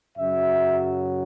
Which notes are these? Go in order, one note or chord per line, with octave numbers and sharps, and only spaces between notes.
F#2 C#3 F#3 E5